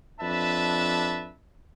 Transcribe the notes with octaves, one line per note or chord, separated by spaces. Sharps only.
F2 D4 B4 E5 A5